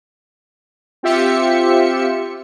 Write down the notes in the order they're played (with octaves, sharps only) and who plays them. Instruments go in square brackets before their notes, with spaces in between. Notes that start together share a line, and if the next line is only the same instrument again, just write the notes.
[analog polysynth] C4 F4 G4 E5 C#7